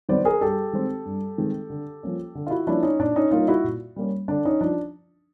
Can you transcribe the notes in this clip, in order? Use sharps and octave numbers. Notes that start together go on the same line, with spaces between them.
D#3 F#3 B3 C5 D5
G#4 A#4
G2 G4 A4
D#3 G#3 C4
G2
D#3 G#3 C4
D3
F3 A#3 C#4
D3
F4
E4 F#4
F3 A#3 C#4 D4 E4
C#4 D#4
A#2 D4
C#4 D#4
G3 A#3 C#4 D#4 F4
E4 F#4
A#2
G3 A#3 C#4
D3 D4
C#4 D#4
F3 D4